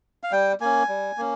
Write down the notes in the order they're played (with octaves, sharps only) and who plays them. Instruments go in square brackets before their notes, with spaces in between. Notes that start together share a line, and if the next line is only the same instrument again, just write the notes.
[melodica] F5
G3 G5
A#3 C#4 G#5
G3
A#3 C#4